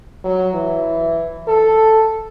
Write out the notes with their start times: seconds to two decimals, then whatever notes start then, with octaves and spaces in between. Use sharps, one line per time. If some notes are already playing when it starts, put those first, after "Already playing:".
0.24 F#3
0.54 E3
1.48 A4